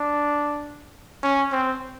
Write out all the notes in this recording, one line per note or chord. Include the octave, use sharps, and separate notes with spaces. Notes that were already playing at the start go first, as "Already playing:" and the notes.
Already playing: D4
C#4
C4